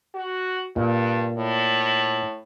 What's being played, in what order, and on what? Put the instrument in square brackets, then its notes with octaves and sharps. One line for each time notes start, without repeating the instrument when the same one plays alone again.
[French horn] F#4
[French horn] G2 [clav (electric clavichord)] A#2
[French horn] A2